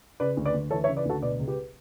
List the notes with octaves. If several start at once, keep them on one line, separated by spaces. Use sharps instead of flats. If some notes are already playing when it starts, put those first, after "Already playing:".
C#3 B4 D5
D2
B4 D5
D2
E3 A4 C#5
C#5 E5
C#3
B4 D5
D2 F#4 A4
B2 B4 D5
C#2
G4 B4